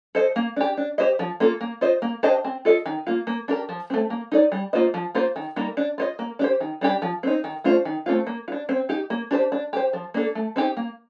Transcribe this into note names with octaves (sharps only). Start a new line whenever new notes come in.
A4 C5 D#5
A#3
D4 G4
D4
G4 C5 D#5
F3
A#3 F4 A4
A#3
F4 C5 D#5
A#3
D4 G4 C5 D#5
C4
F4 A4 D#5
D#3
A#3 F4
A#3
D4 G4 A#4
F3
A3 C4
A#3
D#4 A4 D5
G3
A#3 F4 C5 D#5
F3
A#3 F4 C5
D#3
G3 A#3 D#4 A#4
D4
F4 C5 D#5
A#3
D4 G4 C5
D#3
G3 D4 G4
F3
C4 D#4
D#3
A3 D4 F4 C5
D#3
A3 C4 F4
A#3
F4
D4
C4
D#4 G4
A#3
D4 G4 C5
D4
G4 C5
F3
A#3 D4 A4
A3
C4 D#4 G4
A#3